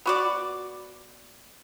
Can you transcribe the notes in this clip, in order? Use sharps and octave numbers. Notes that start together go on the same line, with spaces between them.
B3 F#4 D5